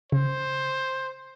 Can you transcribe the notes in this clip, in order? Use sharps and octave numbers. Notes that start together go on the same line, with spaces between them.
C#3 C5